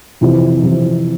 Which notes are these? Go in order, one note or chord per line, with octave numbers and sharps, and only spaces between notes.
F2 C3 E3
F2 C3 E3